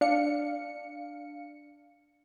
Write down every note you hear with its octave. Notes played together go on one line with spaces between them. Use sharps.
D4 F5 C#7